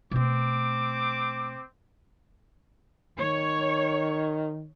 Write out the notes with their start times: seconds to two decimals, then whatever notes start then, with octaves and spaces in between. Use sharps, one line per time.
0.11 B2 A3 C4 D6
3.18 D#3 C#5